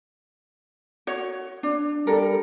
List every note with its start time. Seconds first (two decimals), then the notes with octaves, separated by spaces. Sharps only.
1.07 F#4 C#5
1.63 D4
2.07 G3 A4 A#4